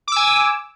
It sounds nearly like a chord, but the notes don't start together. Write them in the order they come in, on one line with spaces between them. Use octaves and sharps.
D6 E6 G#5